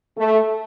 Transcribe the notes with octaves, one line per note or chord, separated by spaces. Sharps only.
A3